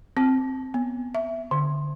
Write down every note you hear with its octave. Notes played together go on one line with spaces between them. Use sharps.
C4
B3
E5
D3